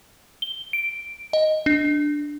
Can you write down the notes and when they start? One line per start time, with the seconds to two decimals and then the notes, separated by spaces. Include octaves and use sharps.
0.42 G7
0.73 D7
1.33 D#5
1.66 D4